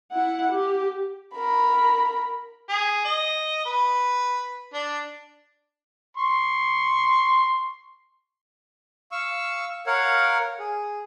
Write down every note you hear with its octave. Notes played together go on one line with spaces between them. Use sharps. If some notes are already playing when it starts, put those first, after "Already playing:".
E4 F#5
G4
A#4 B5
G#4
D#5
B4
D4
C6 C#6
F5 C#6 E6
A#4 C#5 F5 F#5
G#4